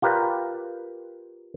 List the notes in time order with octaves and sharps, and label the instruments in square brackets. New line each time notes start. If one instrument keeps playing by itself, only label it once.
[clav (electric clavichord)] F4 G4 A#4 B4 D5